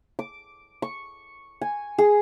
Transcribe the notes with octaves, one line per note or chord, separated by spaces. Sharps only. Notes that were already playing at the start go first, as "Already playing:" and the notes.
D6
C#6
G#5
G#4